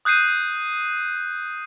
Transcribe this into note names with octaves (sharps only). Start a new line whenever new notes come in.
D#6 F#6 G6 C7 D#7